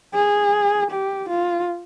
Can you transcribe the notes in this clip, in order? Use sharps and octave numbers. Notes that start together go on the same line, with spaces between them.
G#4
G4
F4